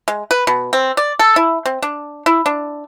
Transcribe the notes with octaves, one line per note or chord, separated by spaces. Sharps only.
G#3
B4
B2
C4
D5
A4
E4
C4
D4
E4
D4